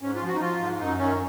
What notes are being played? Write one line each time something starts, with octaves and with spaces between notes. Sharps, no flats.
G#2 C#4
F4
F3
F#4
D#4
F3 F4
G#2
F#2 D#4
D#3 C#4